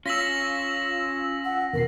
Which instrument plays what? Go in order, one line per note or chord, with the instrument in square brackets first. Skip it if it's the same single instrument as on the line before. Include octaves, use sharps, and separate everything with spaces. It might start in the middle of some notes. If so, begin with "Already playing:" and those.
[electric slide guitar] C#4 [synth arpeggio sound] F4 E6 [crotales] A#6 B6 F#7
[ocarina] F#5
[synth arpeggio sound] E2 B2 C7 [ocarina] A#4